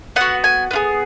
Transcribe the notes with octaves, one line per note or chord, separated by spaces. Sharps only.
B3 F#4 F#5
G#5
B3 F4 G#4